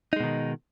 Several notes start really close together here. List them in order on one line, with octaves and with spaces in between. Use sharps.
D#4 G#3 B2 D#3